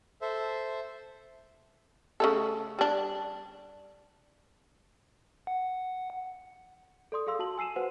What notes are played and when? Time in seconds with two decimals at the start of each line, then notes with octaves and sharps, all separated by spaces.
0.21 A4 C5 E5
2.20 C#3 A3 A4
2.79 G3 D4
5.47 F#5
7.12 A4 D5 C6 D#6
7.27 G#4 A4 F5 C6 E6
7.39 F#4 A5 F#7
7.58 G#5 E6 C7 D#7 E7
7.76 F#4 B4 C5 F#5